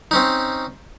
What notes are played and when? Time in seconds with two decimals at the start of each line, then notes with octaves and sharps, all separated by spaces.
0.11 C4 C#4 D#4